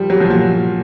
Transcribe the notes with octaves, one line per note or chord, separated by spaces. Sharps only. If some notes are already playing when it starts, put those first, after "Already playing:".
Already playing: F3 G3
F#3
F3
A#2 F#3